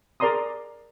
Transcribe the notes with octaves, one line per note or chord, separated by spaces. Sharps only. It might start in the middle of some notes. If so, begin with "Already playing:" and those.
G#4 A#4 D5 A#5 C6 D#6